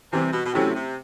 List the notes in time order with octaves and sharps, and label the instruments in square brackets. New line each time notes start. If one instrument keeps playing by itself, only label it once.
[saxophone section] C3 [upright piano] E3 G3 C4
[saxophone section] B2
B2
[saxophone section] C3 [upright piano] F#3 A3 C#4 E4 G4
[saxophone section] C3